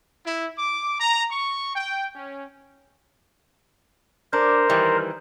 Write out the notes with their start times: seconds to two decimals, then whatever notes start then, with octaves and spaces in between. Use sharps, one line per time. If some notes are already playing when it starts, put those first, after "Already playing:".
0.25 E4
0.57 D6
0.99 A#5
1.30 C#6
1.74 G5
2.15 C#4
4.33 D4 A#4 C5
4.69 D#3 E3 G3